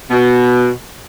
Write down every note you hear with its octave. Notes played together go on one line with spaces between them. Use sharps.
B2